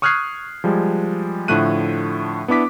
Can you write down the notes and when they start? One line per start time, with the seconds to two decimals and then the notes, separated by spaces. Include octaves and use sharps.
0.02 C#6 D#6 F6 F#6 G#6 C7
0.64 F3 G3 G#3
1.48 A2 D3 F3 A3 F#6 D#7
2.48 B3 D4 E4 D6 B6